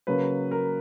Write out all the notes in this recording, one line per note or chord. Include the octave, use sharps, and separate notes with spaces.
C#3 F#3 A#3 B4
A#4